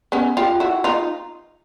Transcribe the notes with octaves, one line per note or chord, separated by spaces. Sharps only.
B3 C#4
F4 G4
E4 F#4
D#4 F4